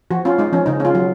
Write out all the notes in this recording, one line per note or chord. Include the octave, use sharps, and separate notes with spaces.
F3 F#4
C#4 F4
G#3 D#4
F3 C#4
C#3 D#4
C#4 F4
F#3